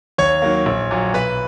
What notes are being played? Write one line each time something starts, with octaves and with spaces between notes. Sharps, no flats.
D#2 C#5 C#6
D#3 F#3 A#3
A#1
A#2 F#3
B1 B4 B5